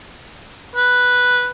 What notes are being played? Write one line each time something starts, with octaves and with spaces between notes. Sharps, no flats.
B4